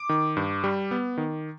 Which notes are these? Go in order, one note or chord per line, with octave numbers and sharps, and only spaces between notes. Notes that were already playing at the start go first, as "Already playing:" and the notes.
Already playing: D6
D#3
G2
G3
B3
D#3